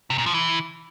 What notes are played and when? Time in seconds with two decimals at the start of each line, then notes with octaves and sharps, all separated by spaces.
0.10 C3
0.18 A#2
0.26 F3
0.34 E3